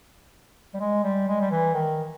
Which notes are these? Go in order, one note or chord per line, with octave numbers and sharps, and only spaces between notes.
G3
G#3
G3
G#3
G3
E3
D#3